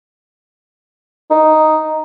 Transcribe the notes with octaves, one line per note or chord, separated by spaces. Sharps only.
D#4